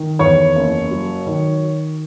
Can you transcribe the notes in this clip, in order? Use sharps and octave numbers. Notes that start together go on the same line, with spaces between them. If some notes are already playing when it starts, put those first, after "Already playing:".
Already playing: D#3
E2 C#5 C#6
F#1
F#3
D#3